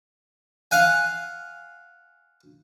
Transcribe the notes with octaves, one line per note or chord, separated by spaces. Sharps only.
F5 F#5 G#5